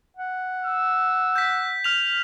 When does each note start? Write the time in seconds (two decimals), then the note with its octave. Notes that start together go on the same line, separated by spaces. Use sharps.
0.17 F#5
0.64 E6
1.36 G6 B6
1.84 F6 F7